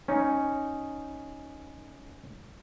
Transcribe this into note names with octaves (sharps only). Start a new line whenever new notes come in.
C#4 D#4